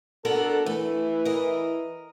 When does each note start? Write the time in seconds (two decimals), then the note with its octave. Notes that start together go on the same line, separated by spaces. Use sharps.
0.25 B3 D4 F#4 A4 A#4
0.66 E3 A3
1.25 A#4 D#5